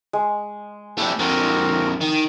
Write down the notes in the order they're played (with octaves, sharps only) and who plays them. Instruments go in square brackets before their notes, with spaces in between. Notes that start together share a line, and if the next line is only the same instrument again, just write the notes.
[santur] G#3
[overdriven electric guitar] A3 C4 [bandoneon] D4 E4 G4
[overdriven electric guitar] F2 D3 [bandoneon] C4 F#4 A#4
[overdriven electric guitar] D#3